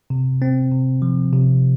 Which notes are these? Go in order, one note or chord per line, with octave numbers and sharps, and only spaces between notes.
C3
C4
C3
F3
C3